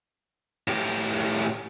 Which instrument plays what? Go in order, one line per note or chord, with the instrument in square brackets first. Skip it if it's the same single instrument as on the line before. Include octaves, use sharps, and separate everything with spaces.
[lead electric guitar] A2 G4